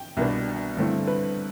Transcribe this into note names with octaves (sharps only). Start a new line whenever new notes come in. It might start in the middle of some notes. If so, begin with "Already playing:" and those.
Already playing: G5
C2 B2 B3 D4
G2 D3 A3 C4 E4
B4